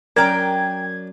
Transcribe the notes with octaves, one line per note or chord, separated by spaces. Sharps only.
F#2 D4 A#4 G5 A#5 G#6